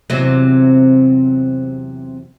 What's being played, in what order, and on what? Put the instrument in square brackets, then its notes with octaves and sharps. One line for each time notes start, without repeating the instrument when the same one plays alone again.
[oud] E2 C3 F#3